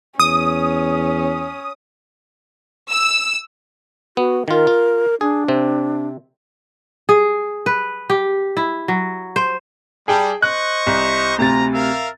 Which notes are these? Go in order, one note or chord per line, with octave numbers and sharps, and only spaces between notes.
E2 C#4 D#6
E6
B3 F#4
D#3 F4 A#4
F4
D4 G#4
C3 C4
G#4
B4
G4
E4
F#3
C5
G3 G#4 G5 A5
C5 D#5 C#6 F#6
C2
D2 C3 F4 A#5 A6
A#4 E5 F5